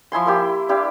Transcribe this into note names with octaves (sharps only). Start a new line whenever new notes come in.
F3 E4 G#5 C6
A#3 E4 G4
D4 E4 G4 F5